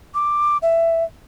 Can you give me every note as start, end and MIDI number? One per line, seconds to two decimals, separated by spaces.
0.14 0.57 86
0.62 1.04 76